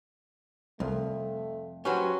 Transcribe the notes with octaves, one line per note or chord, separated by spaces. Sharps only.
C2 F2 A3
F#3 C#4 F#4 G4 B4 C5